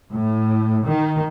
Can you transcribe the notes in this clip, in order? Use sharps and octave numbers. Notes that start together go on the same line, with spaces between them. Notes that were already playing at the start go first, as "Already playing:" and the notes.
A2
D#3